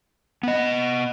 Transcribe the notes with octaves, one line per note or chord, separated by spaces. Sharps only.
B3 D#5